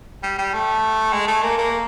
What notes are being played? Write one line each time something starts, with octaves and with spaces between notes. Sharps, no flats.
G3
G3
A3
G#3
A3
A#3
A#3